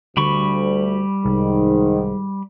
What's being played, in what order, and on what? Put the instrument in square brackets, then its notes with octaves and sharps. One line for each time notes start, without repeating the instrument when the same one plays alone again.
[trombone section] D2 [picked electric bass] D3 [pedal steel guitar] G3 B5 C#6
[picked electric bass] C2 [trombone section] G#2 D#3